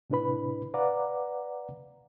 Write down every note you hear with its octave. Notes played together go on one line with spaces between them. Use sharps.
A2 C3 D4 E4 B4 B5
B4 D5 F5 F#5 A#5 D6